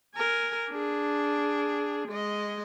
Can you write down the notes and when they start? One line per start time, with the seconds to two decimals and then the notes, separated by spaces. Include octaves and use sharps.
0.16 A#4 G#5
0.70 D4 G#4
2.09 G#3 D#5